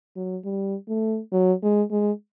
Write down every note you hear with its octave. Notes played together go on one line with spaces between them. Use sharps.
F#3
G3
A3
F#3
G#3
G#3